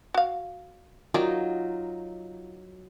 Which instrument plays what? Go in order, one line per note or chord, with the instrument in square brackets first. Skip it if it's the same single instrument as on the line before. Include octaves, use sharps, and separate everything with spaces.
[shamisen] F#4 F5
[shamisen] D#3 D5 [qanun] F#3 D#4 F4